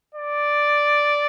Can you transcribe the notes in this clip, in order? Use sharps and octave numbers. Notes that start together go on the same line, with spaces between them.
D5